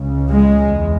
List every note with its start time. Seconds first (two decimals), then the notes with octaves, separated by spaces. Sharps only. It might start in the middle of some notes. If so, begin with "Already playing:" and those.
Already playing: C#2 C#3
0.30 G#3
0.67 E2